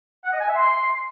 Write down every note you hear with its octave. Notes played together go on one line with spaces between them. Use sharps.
F#5
D#5
G#5
E5
C6